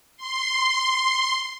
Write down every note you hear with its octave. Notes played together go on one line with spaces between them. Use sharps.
C6